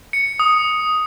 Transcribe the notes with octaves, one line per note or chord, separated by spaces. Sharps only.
C#7
D#6